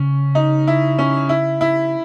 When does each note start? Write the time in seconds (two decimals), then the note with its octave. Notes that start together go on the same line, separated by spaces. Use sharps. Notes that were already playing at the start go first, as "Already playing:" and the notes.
Already playing: C#3 C#4
0.35 D#4
0.67 E4
0.99 C#4
1.29 E4
1.61 E4